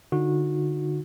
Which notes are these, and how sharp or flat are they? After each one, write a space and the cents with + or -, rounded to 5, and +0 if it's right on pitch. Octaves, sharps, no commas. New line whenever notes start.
D3 +5 D#4 +0 F#4 -25